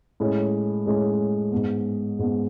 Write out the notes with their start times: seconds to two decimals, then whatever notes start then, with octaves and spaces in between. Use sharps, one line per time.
0.20 A2 G#3 C#4
0.86 A2 G#3 C#4
1.52 G#2 G#3 B3
2.19 G#2 G#3 B3